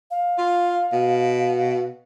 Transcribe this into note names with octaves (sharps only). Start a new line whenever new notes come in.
F5
F4
B2